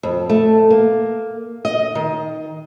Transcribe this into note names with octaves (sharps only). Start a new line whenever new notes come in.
F2
A3
A#3
D#5
D#3